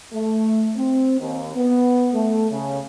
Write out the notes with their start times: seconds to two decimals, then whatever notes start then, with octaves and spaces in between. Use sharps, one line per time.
0.13 A3
0.77 C4
1.19 D#2
1.56 B3
2.13 A3
2.50 C#3